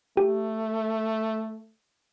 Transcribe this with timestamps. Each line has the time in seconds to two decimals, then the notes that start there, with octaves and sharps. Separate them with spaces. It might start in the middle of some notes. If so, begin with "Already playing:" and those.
0.17 A3 G4